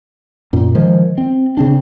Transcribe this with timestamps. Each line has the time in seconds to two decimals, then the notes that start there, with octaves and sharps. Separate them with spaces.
0.53 F#2 A#2
0.75 D#3 F3 G#3
1.18 C4
1.57 C#3 C4 D4